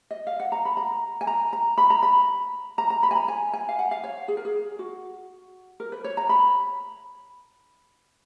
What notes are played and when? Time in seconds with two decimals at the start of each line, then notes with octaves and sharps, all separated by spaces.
0.11 D#5
0.27 F5
0.40 F#5
0.52 A#5
0.65 B5
0.77 A#5
1.21 G#5
1.27 A#5
1.53 A#5
1.78 B5
1.90 A#5
2.03 B5
2.78 A#5
2.90 A#5
3.03 B5
3.11 G#5
3.15 A#5
3.28 G#5
3.53 G#5
3.69 F5
3.79 F#5
3.91 F5
4.04 C#5
4.28 G#4
4.37 A#4
4.45 G#4
4.79 F#4
5.80 A#4
5.92 B4
6.04 C#5
6.17 A#5
6.29 B5